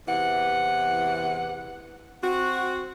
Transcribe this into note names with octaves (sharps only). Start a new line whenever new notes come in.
E2 C3 E3 F#5
C4 F#4